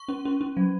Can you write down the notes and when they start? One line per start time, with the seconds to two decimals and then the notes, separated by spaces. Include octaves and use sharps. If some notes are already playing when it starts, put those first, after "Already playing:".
Already playing: C#6
0.08 C#4
0.25 C#4
0.41 C#4
0.57 F#3